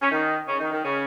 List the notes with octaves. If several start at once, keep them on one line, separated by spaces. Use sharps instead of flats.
C#4
D#3 D#4
C#3 C#4
D#3 D#4
D#3 D#4
C#3 C#4